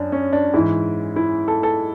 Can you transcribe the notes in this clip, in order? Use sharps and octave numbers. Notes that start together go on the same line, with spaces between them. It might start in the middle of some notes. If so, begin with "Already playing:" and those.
Already playing: F#2 D4
C#4
D4
G#2 E3 E4
E4
A4
A4